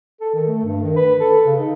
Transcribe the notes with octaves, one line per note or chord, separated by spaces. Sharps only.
A4
D#3
A3
G2
D#3
B4
A4
C#3
D#4